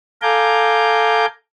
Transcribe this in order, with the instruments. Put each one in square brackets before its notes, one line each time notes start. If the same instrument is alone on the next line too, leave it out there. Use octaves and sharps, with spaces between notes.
[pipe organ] A4 F5 G#5 A#5 D6 G6